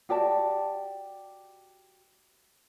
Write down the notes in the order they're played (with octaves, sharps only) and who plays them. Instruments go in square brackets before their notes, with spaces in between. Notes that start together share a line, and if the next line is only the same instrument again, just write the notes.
[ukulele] F#4 G4 D5 A5